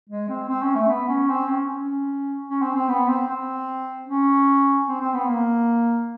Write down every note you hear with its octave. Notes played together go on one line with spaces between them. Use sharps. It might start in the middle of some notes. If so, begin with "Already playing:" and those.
G#3
C4
C4
C#4
A3
B3
C#4
C4
C#4
C#4
C#4
C4
C4
B3
C4
C4
C#4
C4
C4
B3
A#3